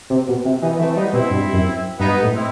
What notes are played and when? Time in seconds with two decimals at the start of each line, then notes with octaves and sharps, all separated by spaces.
0.10 C3
0.28 B2
0.45 C3
0.62 E3 B3 D#4
0.79 E3 A3 C4
0.97 G3 B3 D#4
1.13 B2 C4 E4
1.30 G2
1.53 F#2
1.99 G2 B3 D#4
2.22 A2
2.34 C4 E4